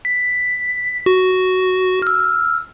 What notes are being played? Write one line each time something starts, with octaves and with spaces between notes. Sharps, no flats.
B6
F#4
E6 F6